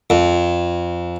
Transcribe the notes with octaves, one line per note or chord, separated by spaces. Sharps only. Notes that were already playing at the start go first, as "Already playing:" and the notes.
F2